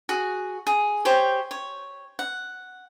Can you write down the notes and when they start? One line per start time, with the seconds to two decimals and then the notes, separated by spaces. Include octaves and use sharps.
0.09 F#4 G#4
0.67 G#4
1.05 G4 C5 C#5
1.51 C#5
2.19 F#5